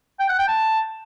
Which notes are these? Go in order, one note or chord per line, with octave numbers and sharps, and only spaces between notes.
G5
F#5
G5
A5